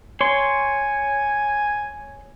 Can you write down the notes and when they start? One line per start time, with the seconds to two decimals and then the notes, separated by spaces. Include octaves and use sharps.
0.21 C#5 G#5 C6